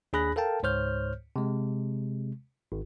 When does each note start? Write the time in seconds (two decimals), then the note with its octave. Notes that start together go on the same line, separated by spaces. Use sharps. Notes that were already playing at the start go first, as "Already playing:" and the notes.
0.13 D#2 D4 G#4 B5 F#6 A#6
0.36 A4 A#4 F5 G5 A5
0.63 C#2 G#2 C5 C#5 F6 G6
1.36 C3 G#3
2.72 G#1